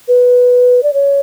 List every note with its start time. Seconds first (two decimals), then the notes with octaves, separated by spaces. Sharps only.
0.08 B4
0.83 D5
0.94 C#5